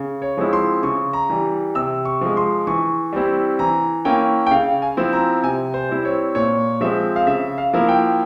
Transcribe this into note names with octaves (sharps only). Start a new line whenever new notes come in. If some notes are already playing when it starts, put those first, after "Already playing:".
Already playing: C#3
C#5
F3 G#3 C4 E4
C6
C#3 C#6
A#5
E3 G3
C3 E6
C#6
F3 G#3
C6
E3 C#6
G3 C4 E4
E3 A#5
A#3 C#4 E4 G5
G5
C#3 F5
G#5
F3 C4 E4
A#5
C3 G#5
C5
G3 C4 E4
C#5
A#2 C#5
F3 G#3 C4 E5
F5
C#3 E5
F5
F3 A#3 E4
G5